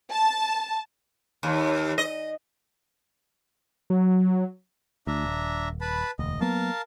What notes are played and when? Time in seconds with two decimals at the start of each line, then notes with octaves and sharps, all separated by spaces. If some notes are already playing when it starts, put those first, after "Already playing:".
0.10 A5
1.43 D#2
1.98 D#5
3.90 F#3
5.07 D2 D4 E5 A#5
5.24 D#1
5.81 B4 A5 B5
6.19 E1 D2 D#5
6.41 F#3 A#3 B3 A#4 F5 A5